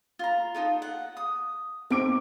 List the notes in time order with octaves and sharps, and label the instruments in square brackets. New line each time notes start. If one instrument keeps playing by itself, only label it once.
[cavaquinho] F4 A#5
D#4 F4 A4
F#5
D#6
[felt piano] C4 D6 D7 [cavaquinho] D#4 C#6